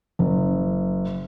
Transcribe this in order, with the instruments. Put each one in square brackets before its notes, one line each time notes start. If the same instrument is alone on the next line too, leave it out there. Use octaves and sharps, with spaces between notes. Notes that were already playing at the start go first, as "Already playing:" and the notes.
[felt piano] F#1